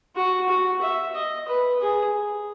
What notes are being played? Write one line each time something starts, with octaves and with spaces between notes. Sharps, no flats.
F#4
F#4
E5
D#5
B4
G#4